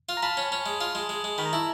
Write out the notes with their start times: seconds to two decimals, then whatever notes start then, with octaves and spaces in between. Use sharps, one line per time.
0.09 F4
0.17 A#5
0.23 F4 A5 B5
0.37 C#4
0.52 C#4
0.66 G#3
0.81 F4
0.95 G#3
1.09 G#3
1.24 G#3
1.38 D#3 B5
1.46 A#5
1.53 E4 A5